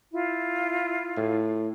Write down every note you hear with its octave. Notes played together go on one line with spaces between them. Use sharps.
E4 F4
A2